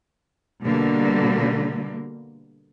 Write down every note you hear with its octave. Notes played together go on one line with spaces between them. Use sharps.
B2 D3 G3 A#3